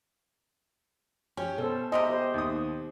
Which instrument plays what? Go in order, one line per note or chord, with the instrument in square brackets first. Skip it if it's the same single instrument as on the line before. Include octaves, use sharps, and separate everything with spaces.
[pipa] C#4 [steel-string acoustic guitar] G4 G#4
[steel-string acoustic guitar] B2 [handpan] A4 C5
[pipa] C3 G3 G#3 [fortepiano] D#5
[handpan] G4 C5
[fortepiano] D#2 D#6